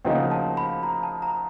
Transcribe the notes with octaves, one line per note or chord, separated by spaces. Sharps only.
D2 C#3 F3 A#3 D#4 G5
A5
B5
A#5
A5
A#5